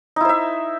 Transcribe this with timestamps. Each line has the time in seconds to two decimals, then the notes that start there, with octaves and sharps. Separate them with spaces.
0.16 D#4
0.21 E4
0.25 C5
0.29 E5